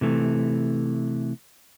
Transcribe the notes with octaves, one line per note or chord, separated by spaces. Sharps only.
C3 E3 A3